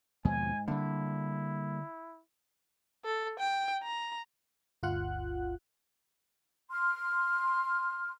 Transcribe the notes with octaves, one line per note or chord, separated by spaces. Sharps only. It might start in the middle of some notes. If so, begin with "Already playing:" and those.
D#2 G#2 B2 F3 G#5
D3 G3 A#3 E4
A4
G5
A#5
G1 D2 F4 F5 F#5 F#6
C6 F6